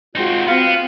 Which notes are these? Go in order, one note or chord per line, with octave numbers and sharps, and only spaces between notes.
G#3 C4 D#4 F4 F#4
B3 C4 F5